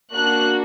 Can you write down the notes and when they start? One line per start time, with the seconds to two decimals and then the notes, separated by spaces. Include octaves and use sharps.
0.13 A#3 D4 F#4 F#6